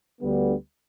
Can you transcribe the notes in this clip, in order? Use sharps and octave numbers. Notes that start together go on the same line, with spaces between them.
D2 D3 G3 B3